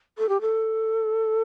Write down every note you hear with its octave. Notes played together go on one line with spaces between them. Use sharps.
A4
G4
A4